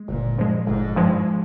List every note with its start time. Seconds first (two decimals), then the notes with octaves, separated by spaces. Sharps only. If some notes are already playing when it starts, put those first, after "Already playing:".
Already playing: G#3
0.08 G1 A#2
0.38 G2 F3 G#3
0.67 G1 G#2
0.96 G2 F3 G#3